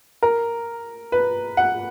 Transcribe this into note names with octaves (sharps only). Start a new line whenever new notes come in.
A#4
B4
F#5